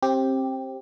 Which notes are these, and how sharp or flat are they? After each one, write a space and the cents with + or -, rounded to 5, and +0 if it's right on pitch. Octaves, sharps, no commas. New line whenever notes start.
C4 +25 G4 +0